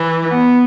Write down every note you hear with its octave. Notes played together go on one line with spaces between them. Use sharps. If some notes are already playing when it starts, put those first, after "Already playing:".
Already playing: E3
B3